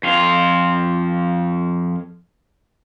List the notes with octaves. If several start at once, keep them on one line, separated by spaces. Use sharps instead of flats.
F2 F4